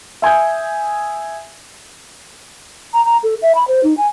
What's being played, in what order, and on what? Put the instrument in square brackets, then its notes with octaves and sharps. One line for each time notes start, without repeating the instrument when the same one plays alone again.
[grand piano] E5 G#5 D#6 G6
[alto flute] A#5
A#5
A4
E5
B5
C5
D#4
G#5